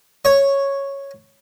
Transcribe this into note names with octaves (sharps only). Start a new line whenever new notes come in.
C#5